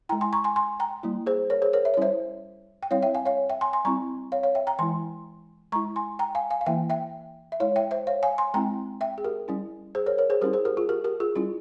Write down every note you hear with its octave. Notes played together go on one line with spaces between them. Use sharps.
G#3 E4 G5 A#5
G#5 C6
A#5 C#6
G#5 C6
G#5 C6
G5 A#5
G3 A#3 E4
G#4 C5
A#4 C#5
G#4 C5
A#4 C#5
E5
C#5
G3 C#4 E4 C5 E5
G5
G3 C4 E4 C#5 F5
E5 G5
F5 G#5
C#5 F5
E5 G5
G#5 C6
G#5 C6
G3 C4 E4 A#5 C#6
C#5 F5
C#5 F5
E5 G5
G5 A#5
E3 G#3 E4 G#5 C6
G#3 E4 A#5 C#6
G#5 C6
G5 A#5
F5 G#5
F5 G#5
F5
E3 A#3 E4 E5 G5
E5 G5
E5
G#3 E4 C#5 F5
E5 G5
C5 E5
C#5 F5
F5 G#5
G#5 C6
G#3 C4 E4 G5 A#5
E5 G5
G#4
G4 A#4
G3 C#4 E4
G#4 C5
A#4 C#5
A#4 C#5
G#4 C5
G3 C#4 E4 G4 A#4
G#4 C5
G4 A#4
F4 G#4
G4 A#4
G4 A#4
F4 G#4
G3 C#4 E4 F4